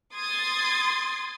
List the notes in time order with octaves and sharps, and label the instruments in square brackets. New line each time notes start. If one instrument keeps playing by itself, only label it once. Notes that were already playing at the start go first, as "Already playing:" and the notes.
[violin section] C6 D#6 G#6 A6